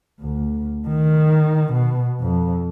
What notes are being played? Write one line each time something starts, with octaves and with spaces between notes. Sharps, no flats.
D2
D#3
B2
F2